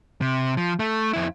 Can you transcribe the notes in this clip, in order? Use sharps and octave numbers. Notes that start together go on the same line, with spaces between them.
C3
F3
A3
F2 E4